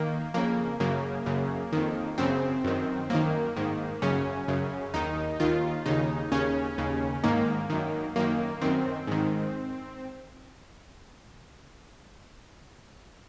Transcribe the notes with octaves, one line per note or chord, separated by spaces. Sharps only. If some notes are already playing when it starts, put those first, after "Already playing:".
Already playing: D#3 A#3
F2 C#3 A#3
F#2 C#3 A#3
F#2 C#3
F2 D#3
F#2 C#3 C4
F#2 D#3
F#2 D#3 A#3
G#2 D#3
F#2 C#3 C#4
F#2 C#3
D#2 D#3 D#4
D#2 D#3 F4
D#2 C#3 D#4
D#2 C#3 C#4
D#2 C#3
G#2 D#3 A#3
F#2 D#3
F#2 D#3 A#3
F#2 D#3 C4
G#2 D#3